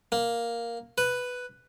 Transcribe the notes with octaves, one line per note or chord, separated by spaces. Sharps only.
A#3
B4